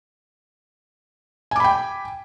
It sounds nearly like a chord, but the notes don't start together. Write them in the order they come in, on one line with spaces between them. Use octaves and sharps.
G#5 D6 B5 G5